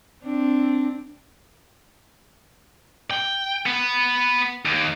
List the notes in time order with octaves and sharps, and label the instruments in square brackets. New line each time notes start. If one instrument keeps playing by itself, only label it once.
[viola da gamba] C4 D4
[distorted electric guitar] G5
B3
D#2